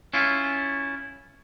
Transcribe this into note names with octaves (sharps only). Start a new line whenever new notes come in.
C#4 E4 F4